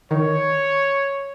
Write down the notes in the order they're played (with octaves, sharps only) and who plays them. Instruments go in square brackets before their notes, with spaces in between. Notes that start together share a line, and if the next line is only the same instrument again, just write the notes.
[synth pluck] D#3 [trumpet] C#5